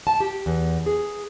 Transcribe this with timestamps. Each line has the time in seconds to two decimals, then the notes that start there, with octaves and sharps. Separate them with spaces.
0.07 A5
0.20 G4
0.46 E2
0.86 G#4